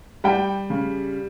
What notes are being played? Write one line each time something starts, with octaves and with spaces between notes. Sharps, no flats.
G3 G5
C#3